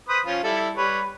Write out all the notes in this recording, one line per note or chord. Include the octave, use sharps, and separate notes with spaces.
B4 C5 D#6
F3 C#4 F4
G3 E4 A4
G3 B4 C#5